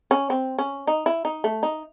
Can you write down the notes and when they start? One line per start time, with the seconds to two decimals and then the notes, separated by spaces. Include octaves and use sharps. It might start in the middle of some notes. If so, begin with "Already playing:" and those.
0.11 C#4
0.30 C4
0.58 C#4
0.87 D#4
1.06 E4
1.25 D#4
1.44 A3
1.63 D#4